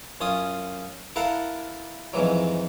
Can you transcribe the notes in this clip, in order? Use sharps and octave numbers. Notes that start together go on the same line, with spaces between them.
F#2 C#4 F4 D#6
E4 A4 A#4 F5 F#5
F2 G#2 E3 F#3